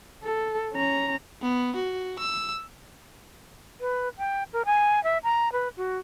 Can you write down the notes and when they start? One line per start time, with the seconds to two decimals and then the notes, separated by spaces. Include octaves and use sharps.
0.24 A4
0.73 C#4 A#5
1.42 B3
1.76 F#4
2.19 E6
3.81 B4
4.18 G5
4.53 A#4
4.65 G#5
5.04 E5
5.24 A#5
5.52 B4
5.77 F#4